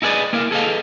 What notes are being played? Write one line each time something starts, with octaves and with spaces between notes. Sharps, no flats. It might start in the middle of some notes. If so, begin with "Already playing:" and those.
D#4 E4 G#4 B4 D5 D#5
A#3 E4 A#4 F5
G#4 A4 B4 D#5 F5